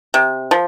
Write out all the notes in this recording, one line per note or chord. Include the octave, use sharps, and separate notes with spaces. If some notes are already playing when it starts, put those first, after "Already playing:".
C3
F3